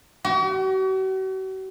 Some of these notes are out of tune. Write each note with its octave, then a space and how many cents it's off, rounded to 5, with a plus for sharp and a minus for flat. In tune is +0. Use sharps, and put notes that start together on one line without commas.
F#4 +45